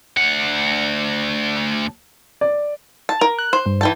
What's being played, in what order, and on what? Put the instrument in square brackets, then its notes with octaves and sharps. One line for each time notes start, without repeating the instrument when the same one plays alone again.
[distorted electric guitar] D2 F#5
[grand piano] D5
[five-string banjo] A5
A#4
[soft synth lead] F#6
[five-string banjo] C5
[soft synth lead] G2
[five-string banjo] E3 G5 A5